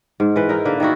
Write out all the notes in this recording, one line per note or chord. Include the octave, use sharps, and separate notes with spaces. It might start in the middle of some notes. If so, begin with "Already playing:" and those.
G#2
E3 B4
D#4 E4 A#4
D3 A#3 B4
D#3 B3 E4 F#4